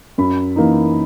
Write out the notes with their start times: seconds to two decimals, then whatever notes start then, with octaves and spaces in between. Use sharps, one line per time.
0.18 F#2 B5
0.56 E3 A#3 D#4